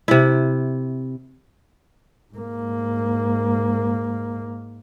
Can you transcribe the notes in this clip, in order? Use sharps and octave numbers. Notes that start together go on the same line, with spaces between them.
C3 E4
G#2 A#3